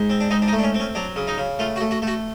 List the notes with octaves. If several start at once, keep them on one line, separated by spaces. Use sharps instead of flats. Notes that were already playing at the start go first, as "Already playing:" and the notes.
Already playing: G#2
C4
D4
G#2 D#4
D4
D#4
A3
D4
C#4
C4
C#4
F#3 D4
C#3
D#4
C#3
A3 F4
F#4
A3
F#4
A3 F#4